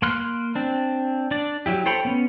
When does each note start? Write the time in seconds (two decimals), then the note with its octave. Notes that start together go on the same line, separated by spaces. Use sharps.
0.02 A#3 B5 C6 F6 F#6
0.55 C4 D4
1.31 D4 D5
1.66 F#3 E4 G4
1.86 A4 C5 C#5 G5 B5
2.05 B3 C#4